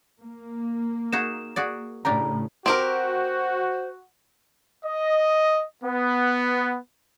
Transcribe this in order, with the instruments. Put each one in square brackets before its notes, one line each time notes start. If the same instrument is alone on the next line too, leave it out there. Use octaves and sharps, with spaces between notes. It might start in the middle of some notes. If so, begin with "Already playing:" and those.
[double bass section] A#3
[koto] D#4 F#4 G#4 [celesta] E7
[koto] F#4 G#4 D5
[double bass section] A2 C#3 [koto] D4 G4 A#4 [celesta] A#5
[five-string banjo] C4 G4 A#4 [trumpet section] F#4 [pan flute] C5
[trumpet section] D#5
B3